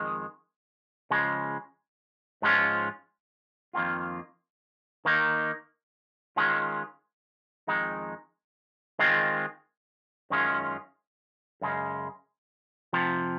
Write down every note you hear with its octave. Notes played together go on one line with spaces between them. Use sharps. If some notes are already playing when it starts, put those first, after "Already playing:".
Already playing: F2 D#3 G#3
C#3 F3 G#3
G#2 F3 G#3 C#4 F4
F2 D#3 A#3 F4
D#3 A#3 D#4
D#3 G#3 C#4 F4
F2 D#3 G#3 D#4
D#3 G#3 C4 F4
F#2 D#3 G#3 C#4 F4
F#2 C#3 G#3
F2 C3 F3